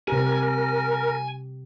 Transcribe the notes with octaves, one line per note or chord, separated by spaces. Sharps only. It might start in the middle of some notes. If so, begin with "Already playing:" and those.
C3 G4 A#4 G#5